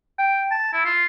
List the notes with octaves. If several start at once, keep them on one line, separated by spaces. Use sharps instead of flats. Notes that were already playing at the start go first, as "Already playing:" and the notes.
G5
A5
E4
F4